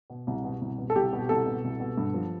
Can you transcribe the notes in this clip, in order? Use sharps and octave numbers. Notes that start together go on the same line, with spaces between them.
B2
C2
B2
C2
B2
A4
C2 G4
B2
C2 A4
B2
C2
B2
G2
F3